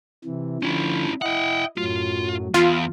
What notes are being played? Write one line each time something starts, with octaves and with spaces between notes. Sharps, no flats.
C3 E3
D3 F3 C#4 E4
E4 D#5 F#5 G5
F#2 A2 F#3 F4
E2 F4